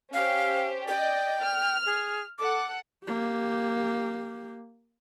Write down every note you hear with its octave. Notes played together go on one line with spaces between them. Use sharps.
C#4 G4 C5 F5
D5 D#5 G5
F6
G#4
A4 F#5 D6
A#3 G4